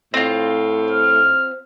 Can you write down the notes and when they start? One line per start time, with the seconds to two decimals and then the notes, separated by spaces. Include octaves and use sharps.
0.14 A2 C4 F4
0.90 F6